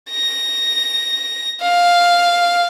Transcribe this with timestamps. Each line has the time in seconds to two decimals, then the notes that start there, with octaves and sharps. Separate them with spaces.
0.11 A#6
1.61 F5